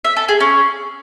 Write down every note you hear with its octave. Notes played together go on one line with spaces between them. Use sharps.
E5
A4
G#4
C#4